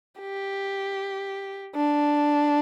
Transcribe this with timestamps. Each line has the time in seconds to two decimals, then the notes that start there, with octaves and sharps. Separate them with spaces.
0.20 G4
1.75 D4